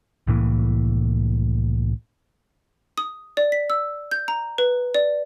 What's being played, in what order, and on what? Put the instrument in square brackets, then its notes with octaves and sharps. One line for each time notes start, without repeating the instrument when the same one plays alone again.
[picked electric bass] C2 A2 E3 A#3
[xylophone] D#6
D5
B6
E6
G6
A#5
B4
D5